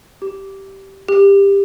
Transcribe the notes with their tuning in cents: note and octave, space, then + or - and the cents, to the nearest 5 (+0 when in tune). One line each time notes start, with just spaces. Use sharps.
G4 -15
G4 +20